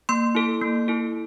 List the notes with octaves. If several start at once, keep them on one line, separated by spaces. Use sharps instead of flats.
A#3 C6
E4 A4
A#3
E4 A4